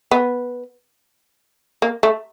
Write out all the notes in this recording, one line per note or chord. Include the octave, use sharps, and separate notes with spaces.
B3
A#3
A3